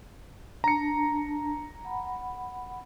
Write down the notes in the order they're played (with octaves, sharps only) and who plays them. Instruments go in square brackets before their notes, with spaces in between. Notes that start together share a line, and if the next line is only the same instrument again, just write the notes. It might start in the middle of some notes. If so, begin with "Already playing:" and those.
[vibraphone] D4 A5 [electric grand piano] A#5 C#7
[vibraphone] F#5 B5